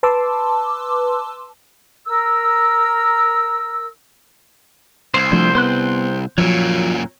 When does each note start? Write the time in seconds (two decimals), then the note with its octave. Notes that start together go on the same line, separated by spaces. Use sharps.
0.03 B4 A5 C6 D6 E6
2.07 A#4 E6
5.14 C2 C5
5.32 F3 A3 D4 C5
5.55 B3 C5 C6 F#6
6.38 F#2 A#2 F3 F#3 C#5